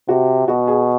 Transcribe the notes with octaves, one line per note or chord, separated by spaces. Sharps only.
C3 F#4
B2 F#4
G#4